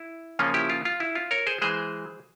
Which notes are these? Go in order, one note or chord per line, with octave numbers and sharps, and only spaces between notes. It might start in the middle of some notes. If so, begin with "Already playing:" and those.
Already playing: E4
C#3 F3 A#3 C#4 F4
E4 G4
F4
F4
E4
F4
A#4 C#5
G#4 C5
E3 G#3 G#4 C5